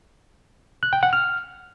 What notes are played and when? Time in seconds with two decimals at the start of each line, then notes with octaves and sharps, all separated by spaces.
0.83 F#6
0.93 G5
1.03 F#5
1.13 F6